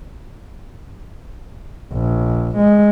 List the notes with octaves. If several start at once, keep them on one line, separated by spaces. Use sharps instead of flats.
A#1
G#3